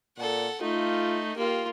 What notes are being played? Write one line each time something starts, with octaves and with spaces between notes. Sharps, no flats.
A#2 A4 F#5
A3 D#4 F4
A#3 F4 G4